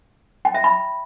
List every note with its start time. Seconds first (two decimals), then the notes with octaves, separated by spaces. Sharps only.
0.45 G5
0.54 E5
0.64 B5